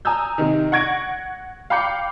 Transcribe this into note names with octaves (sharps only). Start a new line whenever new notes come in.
G#5 A#5 D#6 E6 G6
C3 D#3
F#5 C#6 G#6 A#6 D7
F5 G5 B5 D6 G6 C#7